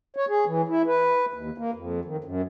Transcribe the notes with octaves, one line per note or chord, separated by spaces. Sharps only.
C#5
G#4
E3
E4
B4
D#2
A#3
F2
D#3
F#2